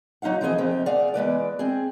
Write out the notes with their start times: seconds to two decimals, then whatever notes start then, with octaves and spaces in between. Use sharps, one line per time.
0.22 F#3 D#4 F4 F5 F#5
0.41 E3 F3 C4 G#4 D#5
0.58 F2 F3 A3 C4
0.86 G#4 D5 F5 F#5
1.14 E2 G#3 B4 D5
1.59 C4 G#4